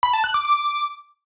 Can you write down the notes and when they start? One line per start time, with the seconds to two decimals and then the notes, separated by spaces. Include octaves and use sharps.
0.03 B5
0.13 A5
0.24 F#6
0.34 D6
0.45 D6